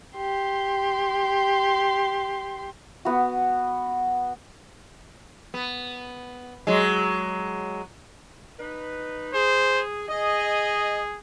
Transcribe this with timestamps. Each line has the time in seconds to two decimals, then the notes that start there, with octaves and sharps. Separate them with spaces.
0.16 G4 C6
3.05 B3 F#4
5.54 B3
6.67 F#3 G#3
8.60 D#4 B4
9.34 G#4 C5
10.09 G#4 D#5